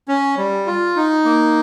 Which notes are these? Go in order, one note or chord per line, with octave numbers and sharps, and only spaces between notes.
C#4
G3
F4
D#4
A#3